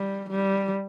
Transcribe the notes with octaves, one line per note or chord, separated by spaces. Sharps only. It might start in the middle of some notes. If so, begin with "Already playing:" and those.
Already playing: G3
G3